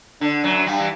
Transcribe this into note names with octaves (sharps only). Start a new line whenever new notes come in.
D3 D4
F#2 F#3
G2 G3
E3